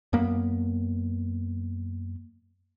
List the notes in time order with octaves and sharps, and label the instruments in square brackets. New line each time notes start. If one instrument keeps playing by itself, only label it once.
[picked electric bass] F#2 A#3 B3